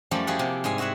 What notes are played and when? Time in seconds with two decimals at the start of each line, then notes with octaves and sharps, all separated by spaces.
0.11 F#2 F3 G3 A3 D5 B5
0.27 F3 E4 G4 G#4 F#5
0.39 C3 A#3
0.64 G#2 G3 G#4 G#5
0.78 E4 F#4 G#4 E5 F#5